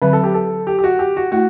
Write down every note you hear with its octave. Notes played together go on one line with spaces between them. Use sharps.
D3 F#3 C4 B4
A4
G4
A4
G4
G4
F#4
G4
F#4
A3 E4 F#4